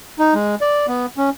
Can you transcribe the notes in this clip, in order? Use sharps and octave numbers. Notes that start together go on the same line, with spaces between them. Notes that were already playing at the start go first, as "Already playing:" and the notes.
D#4
G#3
D5
B3
C#4